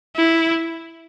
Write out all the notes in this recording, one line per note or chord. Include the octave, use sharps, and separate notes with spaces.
E4